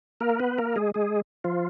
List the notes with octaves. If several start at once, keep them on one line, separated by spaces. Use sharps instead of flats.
A#3 A#4
B3 B4
A#3 A#4
G#3 G#4
G#3 G#4
F3 F4